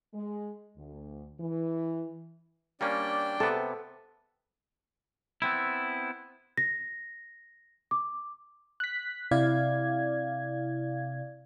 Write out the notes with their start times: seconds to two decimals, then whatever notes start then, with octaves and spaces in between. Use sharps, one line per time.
0.14 G#3
0.77 D2
1.40 E3
2.81 G3 A#3 C#4 D4 D5 G5
3.40 C3 B3 A4
5.42 B3 C4 E4
6.57 A#6
7.91 D6
8.80 F#6 B6
9.31 C3 E4 D5 F5 G#6